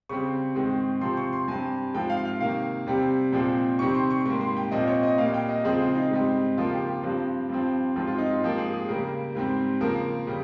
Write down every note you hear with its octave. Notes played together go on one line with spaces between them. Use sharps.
C#3 G3 C4 C#6
G#2 D#3 G#3 C4
C3 F3 C4 C6
C#6
C6
G2 G3 C4 G#5
G#2 F3 C4 G5
F5
F5
C3 D#3 A#3 F5
C3 G3 C4
A#2 F3 G#3 C4 G5
C3 D#3 G3 C4 C#6
C6
C#6
G#2 G3 A#3 C6
C6
G5
A#2 F3 C4 D#5
C#5
D#5
A#2 G3 A#3 F5
G5
D#5
C#3 F3 G#3 C4 G#4
F4
D#4
G#2 G3 C4
C#3 F3 A#3 F4
G4
G4
G2 F3 C4
G2 F3 C4
G#2 F3 G#3 C4 F4
F4
D#4
F4
G#2 F3 A#3 G4
G#4
G#4
C#3 G3 A#3 A#4
G#2 G3 C4
C#3 F3 A#3 A#4
C#3 G3